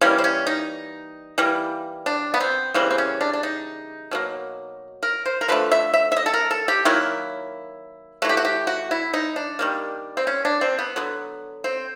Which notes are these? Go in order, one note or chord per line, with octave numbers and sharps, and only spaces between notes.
E3 G3 A#3 C#4
C4
C#4
D#4
E3 G3 A#3
D4
B3
C4
C#3 E3 G3 A#3 C4
C4
C#4
D4
D4
D#4
B2 F#3 A#3
A#4
C5
A#4
D3 F3 A3 B4
E5
E5
E5
D#5
A4
A#4
A4
G4
D#3 F#3 A#3 E4
E3 A3 F#4 G4
F#4
G4
F#4
E4
D#4
D4
D#3 G3 A#3
C4
C#4
D4
C4
B3
D3 F#3 B3
C4